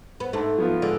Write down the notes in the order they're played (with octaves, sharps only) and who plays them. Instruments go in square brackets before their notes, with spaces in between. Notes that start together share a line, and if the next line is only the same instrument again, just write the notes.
[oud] B3
[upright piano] G#2 [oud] A3
[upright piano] F3 B3 F4
[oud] D3 [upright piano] G#3